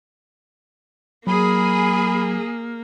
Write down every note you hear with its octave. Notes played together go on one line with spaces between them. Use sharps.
F#3 A#3 G#4 B5